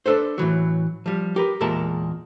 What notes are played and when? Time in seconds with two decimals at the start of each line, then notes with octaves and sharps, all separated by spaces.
0.06 D4 D#4 A4 B4 C5
0.38 A2 C3 E3 F#3
1.06 F3 G3
1.36 G4 A#4 B4
1.61 E2 A#2 G#3 A#4 A5